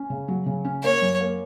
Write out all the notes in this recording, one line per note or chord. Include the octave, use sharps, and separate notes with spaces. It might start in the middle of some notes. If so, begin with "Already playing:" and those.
Already playing: C#4
C#3
F#3
C#3
C#4
A#3 C#5
F#2
A#3